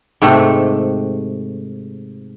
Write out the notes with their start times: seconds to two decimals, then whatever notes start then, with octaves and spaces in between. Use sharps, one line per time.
0.22 G#2 C3 A3 G4